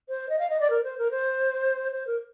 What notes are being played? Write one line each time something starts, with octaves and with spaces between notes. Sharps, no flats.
C5
D#5
F5
D#5
D5
A#4
C5
A#4
C5
C5
A#4